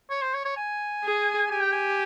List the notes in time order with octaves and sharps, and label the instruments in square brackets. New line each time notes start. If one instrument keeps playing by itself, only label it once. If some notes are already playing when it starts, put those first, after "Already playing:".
[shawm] C#5
C5
C#5
C#5
G#5
[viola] G#4
[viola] G4 [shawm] G#5
[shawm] G5
G#5